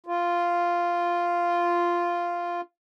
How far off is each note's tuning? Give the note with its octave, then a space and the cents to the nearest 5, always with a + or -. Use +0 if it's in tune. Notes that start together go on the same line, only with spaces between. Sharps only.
F4 -5